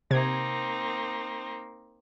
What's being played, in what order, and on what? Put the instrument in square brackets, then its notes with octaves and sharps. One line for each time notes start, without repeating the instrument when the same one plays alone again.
[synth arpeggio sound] C3 G#6 [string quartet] A#3 C4 D#4